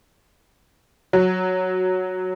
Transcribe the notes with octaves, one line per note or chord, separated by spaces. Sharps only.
F#3